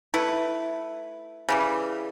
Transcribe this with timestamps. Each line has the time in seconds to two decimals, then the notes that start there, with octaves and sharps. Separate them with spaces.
0.14 A3 E4 B4
1.49 C#3 E3 G3